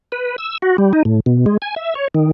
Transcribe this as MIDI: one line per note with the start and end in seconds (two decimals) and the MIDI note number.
0.12 0.36 71
0.38 0.58 88
0.62 0.77 66
0.78 0.93 55
0.93 1.03 63
1.05 1.20 45
1.26 1.46 47
1.46 1.57 56
1.62 1.75 80
1.76 1.94 76
1.95 2.08 73
2.15 2.31 51